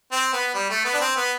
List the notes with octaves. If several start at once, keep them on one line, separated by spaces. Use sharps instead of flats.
C4
B3
G3
A3
B3
D4
C4
B3